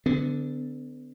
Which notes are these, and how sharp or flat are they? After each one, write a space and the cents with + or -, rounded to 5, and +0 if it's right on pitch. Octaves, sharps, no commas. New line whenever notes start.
D3 +0 B3 +35